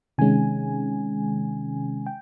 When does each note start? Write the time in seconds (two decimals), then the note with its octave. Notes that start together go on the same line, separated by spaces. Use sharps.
0.18 C3 D#3 G#3 C#4 G#5
2.06 G5